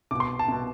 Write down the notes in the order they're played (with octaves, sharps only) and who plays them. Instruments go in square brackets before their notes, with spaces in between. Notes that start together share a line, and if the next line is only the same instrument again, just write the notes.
[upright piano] C2 B2 D6
C6
A5
C2 B2